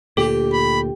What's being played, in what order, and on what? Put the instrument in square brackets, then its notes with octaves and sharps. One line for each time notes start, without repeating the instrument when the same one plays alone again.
[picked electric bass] D2 A#2 [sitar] G4 [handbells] A4
[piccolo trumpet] B5